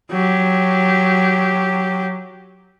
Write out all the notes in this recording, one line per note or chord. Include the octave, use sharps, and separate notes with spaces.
F#3 G4